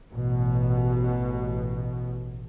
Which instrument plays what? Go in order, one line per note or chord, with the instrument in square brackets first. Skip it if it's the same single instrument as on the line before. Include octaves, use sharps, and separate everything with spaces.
[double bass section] A1 B2